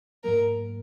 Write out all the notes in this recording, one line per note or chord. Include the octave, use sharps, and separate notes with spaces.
G#2 F#3 A#3 A#4